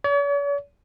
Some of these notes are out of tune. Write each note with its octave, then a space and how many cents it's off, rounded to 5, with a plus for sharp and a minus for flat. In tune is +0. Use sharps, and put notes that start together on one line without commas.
C#5 +45